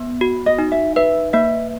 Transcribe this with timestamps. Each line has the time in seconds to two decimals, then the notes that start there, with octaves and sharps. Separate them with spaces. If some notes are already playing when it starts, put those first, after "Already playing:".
Already playing: B3
0.21 F#4
0.46 D#5
0.58 D#4
0.72 E5
0.96 B4 E5
1.33 A#3 E5